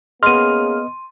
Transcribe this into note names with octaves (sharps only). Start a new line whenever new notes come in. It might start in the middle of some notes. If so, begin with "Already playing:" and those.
A#3 B3 C#4 G#4 D#5 C6 F6 D#7